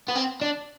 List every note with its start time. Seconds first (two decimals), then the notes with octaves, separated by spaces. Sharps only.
0.09 B3
0.16 C4
0.42 D4